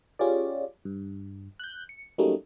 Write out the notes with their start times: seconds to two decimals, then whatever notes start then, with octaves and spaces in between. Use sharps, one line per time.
0.19 C#4 F4 G4 G#4 D5
0.85 G2
1.59 F#6 G6
1.89 C#7
2.18 F#3 G3 A3 A#3 C#4 D#4